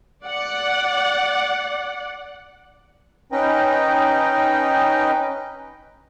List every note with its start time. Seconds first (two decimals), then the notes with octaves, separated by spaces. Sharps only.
0.24 D5 F#5
3.32 C#4 D#4 B4 D#5 G5